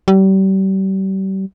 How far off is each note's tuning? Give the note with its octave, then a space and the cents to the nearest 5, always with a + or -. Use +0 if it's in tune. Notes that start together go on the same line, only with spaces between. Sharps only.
G3 -35